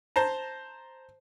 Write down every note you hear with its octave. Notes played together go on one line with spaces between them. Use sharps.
C5 A5 A#5